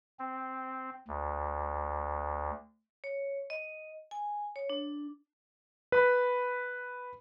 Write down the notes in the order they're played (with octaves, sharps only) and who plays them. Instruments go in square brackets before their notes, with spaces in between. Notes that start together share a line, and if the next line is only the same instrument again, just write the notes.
[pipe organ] C4
D2
[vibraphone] C#5
D#5
G#5
C#5
D4
[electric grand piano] B4 B5